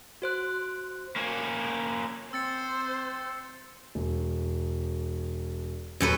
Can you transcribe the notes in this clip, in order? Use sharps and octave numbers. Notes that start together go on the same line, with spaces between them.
F#4 C5 F#6
A#3 C#4
C4 C5 E6 A6 C#7
E1
D#1 F#2 A4 B4